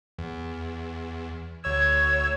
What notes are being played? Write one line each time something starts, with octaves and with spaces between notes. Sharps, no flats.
E2
D2 C#5 E6 G#6